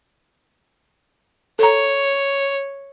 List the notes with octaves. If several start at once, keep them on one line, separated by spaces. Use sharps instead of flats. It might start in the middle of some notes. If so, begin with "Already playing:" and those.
A4 C#5 A#5